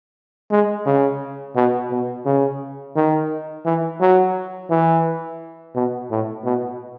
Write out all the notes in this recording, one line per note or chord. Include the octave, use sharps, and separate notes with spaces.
G#3
C#3
B2
B2
C#3
D#3
E3
F#3
E3
B2
A2
B2